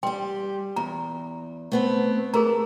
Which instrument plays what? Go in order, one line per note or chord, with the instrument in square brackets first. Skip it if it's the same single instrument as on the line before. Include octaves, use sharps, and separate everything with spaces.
[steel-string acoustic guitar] G3 G4 [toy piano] G5 C6
[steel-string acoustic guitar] E2 [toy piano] A#5
[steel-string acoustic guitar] A3 B3 C4
[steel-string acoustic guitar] A3 [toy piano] G#4 A#4 A#5